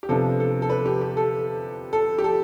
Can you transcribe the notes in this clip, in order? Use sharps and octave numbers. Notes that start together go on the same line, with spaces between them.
G4
C3 F3 B3 D4 A4
A4
A4
B4
G4
G4
A4
A4
G4
A4